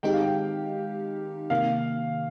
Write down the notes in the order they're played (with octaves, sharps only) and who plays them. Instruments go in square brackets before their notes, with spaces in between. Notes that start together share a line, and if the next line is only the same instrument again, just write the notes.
[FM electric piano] D#3 G#3 C4 D#4 G4 [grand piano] G5
[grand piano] F5
G5
[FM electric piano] C3 D#3 A#3 [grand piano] F5